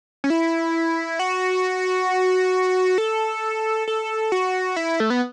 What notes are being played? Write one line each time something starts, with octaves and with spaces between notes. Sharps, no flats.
C#4
E4
F#4
A4
A4
F#4
E4
A3
B3